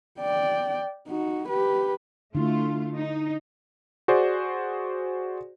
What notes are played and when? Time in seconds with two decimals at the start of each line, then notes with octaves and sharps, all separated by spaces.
0.20 D5 G5
1.08 D#4 F#4
1.48 G4 B4
2.35 D3 A3 E4 F4
2.96 D#4
4.08 F#4 G#4 C5 D5